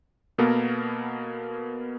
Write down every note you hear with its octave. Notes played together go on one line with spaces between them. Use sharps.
B2 A#3 B3 A4 A#4